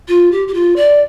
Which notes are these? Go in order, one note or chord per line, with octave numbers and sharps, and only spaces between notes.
F4
G4
G4
F4
D5